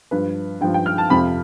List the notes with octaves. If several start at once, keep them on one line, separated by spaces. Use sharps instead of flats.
G2 F3 B4
G2 F3 G5
G5
F6
A5
F2 C3 F3 B5